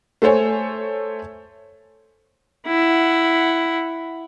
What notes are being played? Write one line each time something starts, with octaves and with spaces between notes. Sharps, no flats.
A3 A4 C5 C#5 G#5
E4 F#5